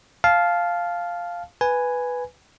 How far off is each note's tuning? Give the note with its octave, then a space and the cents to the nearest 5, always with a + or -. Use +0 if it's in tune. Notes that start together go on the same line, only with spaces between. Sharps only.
F5 +0 A5 -20
B4 +0 G#5 +0